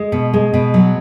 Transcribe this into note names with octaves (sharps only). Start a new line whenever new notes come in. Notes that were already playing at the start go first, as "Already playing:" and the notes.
Already playing: G#3
B2
G#3
B2
F#3